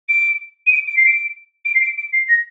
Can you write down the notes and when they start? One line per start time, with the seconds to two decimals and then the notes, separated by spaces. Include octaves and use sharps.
0.09 D7
0.66 D#7
0.72 D7
0.87 D7
0.96 C7
1.06 D7
1.65 D7
1.74 C7
1.81 D7
1.97 D7
2.12 C7
2.28 A#6